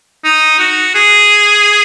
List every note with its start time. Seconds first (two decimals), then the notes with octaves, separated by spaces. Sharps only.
0.24 D#4
0.60 F#4
0.95 G#4